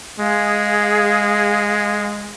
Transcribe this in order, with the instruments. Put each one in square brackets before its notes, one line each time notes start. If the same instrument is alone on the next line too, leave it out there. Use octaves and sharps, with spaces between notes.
[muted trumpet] G#3 [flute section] G#4 F5